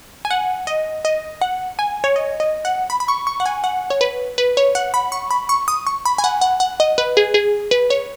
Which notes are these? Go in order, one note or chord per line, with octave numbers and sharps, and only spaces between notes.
G#5
F#5
D#5
D#5
F#5
G#5
C#5
D#5
D#5
F#5
B5
B5
C#6
C#6
F#5
G#5
F#5
C#5
B4
B4
C#5
F#5
B5
C#6
B5
C#6
D#6
C#6
B5
G#5
F#5
F#5
F#5
D#5
B4
G#4
G#4
B4
C#5